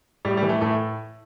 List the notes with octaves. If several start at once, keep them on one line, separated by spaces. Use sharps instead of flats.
A2 G3
G3
E3
A3
A2 A3